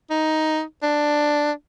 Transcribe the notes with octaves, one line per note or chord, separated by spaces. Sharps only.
D#4
D4